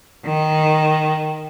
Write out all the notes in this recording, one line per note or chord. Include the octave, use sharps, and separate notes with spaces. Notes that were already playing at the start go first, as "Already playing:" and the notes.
D#3